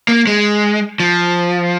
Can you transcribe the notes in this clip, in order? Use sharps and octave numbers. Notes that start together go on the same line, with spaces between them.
A#3
G#3
F3